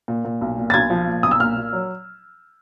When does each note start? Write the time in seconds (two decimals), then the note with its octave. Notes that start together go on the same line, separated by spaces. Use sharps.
0.08 A#2
0.25 A#2
0.41 B1
0.58 A#2
0.70 A6
0.74 B1 G#6
0.90 F3
1.07 A#2
1.23 B1 D#6
1.31 E6
1.40 A#2 F6
1.57 A#2
1.73 F#3